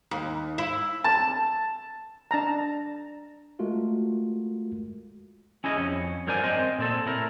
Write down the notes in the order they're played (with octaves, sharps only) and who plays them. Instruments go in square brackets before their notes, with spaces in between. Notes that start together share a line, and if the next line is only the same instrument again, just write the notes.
[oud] D#2
E4
[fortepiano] A5
[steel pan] D4 A5 A#5
[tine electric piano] G#3 A3 F4 F#4 A#4
[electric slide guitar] C#4 E4 G#4 D#5
F2 C#4
G2 F#3 A#4 C5 D5 G#5
C4 C5 D#5 G#5
A#2 C4 A4
A2 E4 A#4